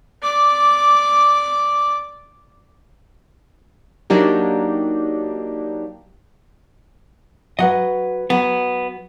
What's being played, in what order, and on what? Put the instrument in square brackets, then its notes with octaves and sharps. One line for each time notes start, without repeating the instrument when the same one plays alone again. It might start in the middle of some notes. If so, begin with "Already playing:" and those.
[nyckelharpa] D5 D6
[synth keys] F#3 A#3 D4 D#4 G4
[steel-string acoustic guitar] F#3 B4 [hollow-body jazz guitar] D#5 F#5
[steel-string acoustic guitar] F#3 [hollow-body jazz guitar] B3